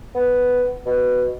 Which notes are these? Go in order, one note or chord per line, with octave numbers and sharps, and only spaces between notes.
B3
B2